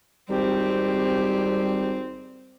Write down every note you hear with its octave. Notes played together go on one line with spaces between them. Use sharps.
G#1 G3 C4 G4